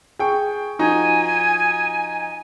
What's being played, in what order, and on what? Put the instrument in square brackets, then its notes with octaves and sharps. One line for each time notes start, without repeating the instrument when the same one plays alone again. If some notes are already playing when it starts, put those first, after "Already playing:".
[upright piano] G#4 G5 C#6
[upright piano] F3 D#4 F#4 [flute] G#5